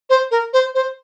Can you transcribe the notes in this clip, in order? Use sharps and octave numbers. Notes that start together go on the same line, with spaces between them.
C5
A#4
C5
C5